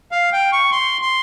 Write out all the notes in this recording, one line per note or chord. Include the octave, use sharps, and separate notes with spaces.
F5
G5
C#6
C6
C6